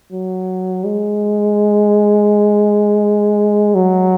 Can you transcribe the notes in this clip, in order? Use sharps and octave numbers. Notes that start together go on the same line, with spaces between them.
F#3
G#3
F#3